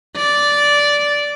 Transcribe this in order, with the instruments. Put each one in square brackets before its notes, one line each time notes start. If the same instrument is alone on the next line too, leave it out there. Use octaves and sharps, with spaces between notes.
[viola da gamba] D5